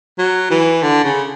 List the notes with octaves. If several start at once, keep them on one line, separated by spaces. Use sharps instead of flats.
F#3
E3
D3
C#3